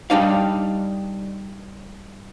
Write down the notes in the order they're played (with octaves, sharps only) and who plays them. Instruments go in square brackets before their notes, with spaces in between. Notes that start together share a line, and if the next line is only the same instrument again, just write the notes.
[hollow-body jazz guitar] G3 D4 D#4 D5 F5